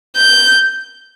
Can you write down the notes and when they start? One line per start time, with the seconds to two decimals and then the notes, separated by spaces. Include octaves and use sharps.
0.17 G6